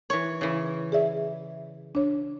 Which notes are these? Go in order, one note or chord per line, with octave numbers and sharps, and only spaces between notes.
E3 C#5
C#3 E3
G#4 D5 E5
D4 C#5